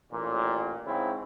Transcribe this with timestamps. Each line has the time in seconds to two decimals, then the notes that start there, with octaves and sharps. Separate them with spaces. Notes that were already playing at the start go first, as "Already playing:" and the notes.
0.11 A1 A#2
0.86 G#2 C#3 C4 E4